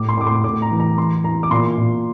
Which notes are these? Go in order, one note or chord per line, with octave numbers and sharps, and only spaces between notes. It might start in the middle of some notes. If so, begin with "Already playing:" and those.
Already playing: A2 D6
C6
A2 D6
C6
A2 D6
A#5
E3
A#5
E3 C6
E3 A#5
D6
A#2 C6
A#2